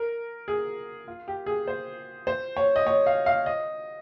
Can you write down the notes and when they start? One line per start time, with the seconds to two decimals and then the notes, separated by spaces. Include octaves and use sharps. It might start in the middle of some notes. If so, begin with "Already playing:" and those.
Already playing: A#4
0.48 G#4
1.08 F4
1.28 G4
1.46 G#4
1.68 C5
2.27 C5
2.57 C#5
2.76 D#5
2.87 C#5
3.06 F5
3.26 F5
3.46 D#5